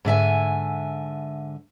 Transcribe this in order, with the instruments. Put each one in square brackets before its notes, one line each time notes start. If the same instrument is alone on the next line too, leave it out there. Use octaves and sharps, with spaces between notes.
[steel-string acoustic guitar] G#2 D3 E5 G#5